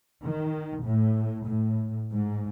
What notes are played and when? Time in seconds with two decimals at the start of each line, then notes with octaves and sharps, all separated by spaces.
0.25 D#3
0.84 A2
1.47 A2
2.11 G#2